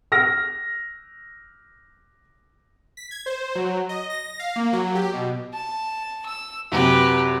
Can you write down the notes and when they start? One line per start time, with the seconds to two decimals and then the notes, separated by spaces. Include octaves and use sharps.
0.12 F6 A#6
2.97 B6
3.11 G#6
3.26 C5
3.55 F#3
3.89 D#5
4.10 A#6
4.39 F5
4.56 A#3
4.73 F#3
4.95 G4
5.13 B2
5.53 A5
6.25 E6
6.72 F#2 C3 G4 B4